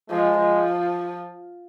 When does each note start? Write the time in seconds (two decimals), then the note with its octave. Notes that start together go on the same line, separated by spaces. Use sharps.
0.10 F3 G#3
0.38 F3